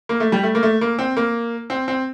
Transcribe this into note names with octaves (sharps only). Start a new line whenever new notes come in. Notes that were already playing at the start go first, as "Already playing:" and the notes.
A#3
A3
G3
A3
A#3
A3
A#3
C4
A#3
C4
C4